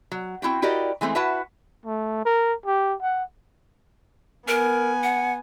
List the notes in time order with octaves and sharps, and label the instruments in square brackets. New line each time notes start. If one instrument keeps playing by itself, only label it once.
[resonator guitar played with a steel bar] F#3
C4 E4 F#4 G5
E4 F#4 G4 A#4 D5 D#5
E3 G#3 A3 C4
E4 F#4 B4 E5 F#5 A5
[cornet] A3
A#4
G4
F#5
[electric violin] B3 G#5 [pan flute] A#4
[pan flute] F#5